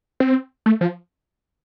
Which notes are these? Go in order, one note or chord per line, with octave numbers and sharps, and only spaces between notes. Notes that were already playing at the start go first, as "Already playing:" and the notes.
C4
A3
F3